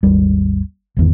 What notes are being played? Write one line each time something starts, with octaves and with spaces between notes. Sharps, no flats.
G#1 D#2 G3
G#1 E2 D#3